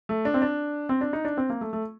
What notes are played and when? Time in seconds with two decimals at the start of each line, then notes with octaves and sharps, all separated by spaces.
0.09 A3
0.25 D4
0.34 C4
0.42 D4
0.89 C4
1.01 D4
1.13 D#4
1.25 D4
1.37 C4
1.50 A#3
1.61 A3
1.73 A3